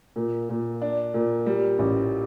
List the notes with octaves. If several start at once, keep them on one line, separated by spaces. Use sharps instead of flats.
A#2
A#2
D4
A#2
G3
A1